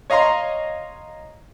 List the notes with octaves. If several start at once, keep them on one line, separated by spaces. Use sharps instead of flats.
C#5 D#5 F5 A#5 C6